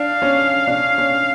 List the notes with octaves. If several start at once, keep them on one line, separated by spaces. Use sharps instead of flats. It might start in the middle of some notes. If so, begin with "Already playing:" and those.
Already playing: D4 F5
C#4
D4
C#4